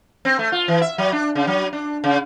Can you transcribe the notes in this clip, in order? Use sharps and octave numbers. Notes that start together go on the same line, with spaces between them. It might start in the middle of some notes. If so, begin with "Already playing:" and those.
C4
A3
F4
E3
E5
F#3
D4
C#3
F#3
D4
C#3